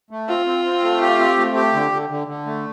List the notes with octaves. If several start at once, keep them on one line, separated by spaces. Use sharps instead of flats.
A3
C4 F4
C4
C4
A3
G4
C4
A3
G4
D3
D3
D3
D3
A3